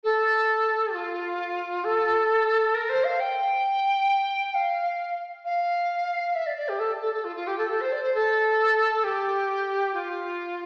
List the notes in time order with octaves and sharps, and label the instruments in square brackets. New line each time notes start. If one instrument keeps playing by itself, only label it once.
[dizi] A4
F4
A4
A#4
C5
F5
G5
F5
F5
E5
D5
D5
G4
A4
A4
A4
F4
F4
G4
A4
A4
C5
D5
C5
A4
G4
F4